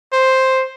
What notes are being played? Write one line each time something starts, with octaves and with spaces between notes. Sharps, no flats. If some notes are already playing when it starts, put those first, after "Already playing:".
C5